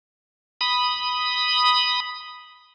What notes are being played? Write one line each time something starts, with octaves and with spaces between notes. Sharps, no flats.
B5 D#6